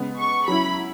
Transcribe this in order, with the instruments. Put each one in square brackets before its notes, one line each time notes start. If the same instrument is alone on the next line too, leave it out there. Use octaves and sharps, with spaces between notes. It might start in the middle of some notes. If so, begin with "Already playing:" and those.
Already playing: [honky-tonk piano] C#3 G#3 B3
[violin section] C#6
[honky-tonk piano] F#3 C#4 E4 [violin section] B5